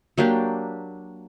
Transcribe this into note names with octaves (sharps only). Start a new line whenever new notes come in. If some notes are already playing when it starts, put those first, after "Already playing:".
F#3 A#3 D4 G4